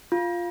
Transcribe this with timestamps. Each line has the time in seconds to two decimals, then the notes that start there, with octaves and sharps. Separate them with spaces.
0.12 F4